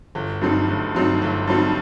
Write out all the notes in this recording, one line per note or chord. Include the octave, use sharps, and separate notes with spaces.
G1
G2 F#3 C4 D#4
G1
G2 F#3 C4 D#4
G1
G2 F#3 C4 D#4